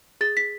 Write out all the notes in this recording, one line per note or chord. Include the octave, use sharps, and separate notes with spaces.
G#4 A6
B6